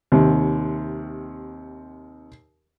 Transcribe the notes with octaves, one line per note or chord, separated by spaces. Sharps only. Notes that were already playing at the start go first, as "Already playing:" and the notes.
D#2 C3